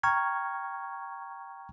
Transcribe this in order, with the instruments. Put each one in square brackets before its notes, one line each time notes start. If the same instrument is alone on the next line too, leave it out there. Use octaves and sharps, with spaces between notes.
[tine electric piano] G5 A#5 C#6 F6 G#6